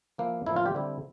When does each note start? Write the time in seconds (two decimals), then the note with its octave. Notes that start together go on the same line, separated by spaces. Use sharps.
0.18 F3 A#3 E4
0.46 A2 F3 A#3 E4
0.56 F4
0.66 G4
0.75 D3 G3 C4 E4